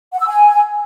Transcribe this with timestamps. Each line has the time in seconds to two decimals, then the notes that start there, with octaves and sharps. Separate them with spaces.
0.12 F#5
0.20 E6
0.27 G#5